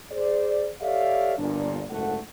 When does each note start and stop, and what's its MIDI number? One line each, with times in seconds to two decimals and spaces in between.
0.12 0.69 68
0.12 0.69 72
0.12 0.69 74
0.81 1.35 67
0.81 1.35 69
0.81 1.35 73
0.81 1.35 74
0.81 1.35 76
0.81 1.35 77
1.38 1.83 31
1.38 1.83 46
1.38 1.83 62
1.90 2.16 30
1.90 2.16 44
1.90 2.16 57
1.90 2.16 69
1.90 2.16 78